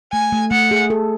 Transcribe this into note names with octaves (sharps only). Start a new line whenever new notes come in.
A3 G#5
A3
A3 F#5
G#4
A4